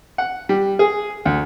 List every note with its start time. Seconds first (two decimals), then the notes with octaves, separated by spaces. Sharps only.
0.18 F#5
0.49 G3
0.79 G#4
1.25 D2